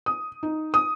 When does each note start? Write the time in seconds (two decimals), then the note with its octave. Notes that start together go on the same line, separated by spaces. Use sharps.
0.06 D#6
0.43 D#4
0.74 D#6